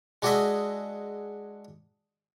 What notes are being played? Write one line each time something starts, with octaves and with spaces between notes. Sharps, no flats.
G#3 D4 F#4 G#4 D#5 E5